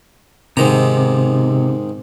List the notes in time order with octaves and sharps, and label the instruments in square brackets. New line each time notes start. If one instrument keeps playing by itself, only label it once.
[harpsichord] G#2 D#3 A#5 [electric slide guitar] C3